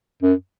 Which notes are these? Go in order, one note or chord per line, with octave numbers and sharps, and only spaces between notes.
F#2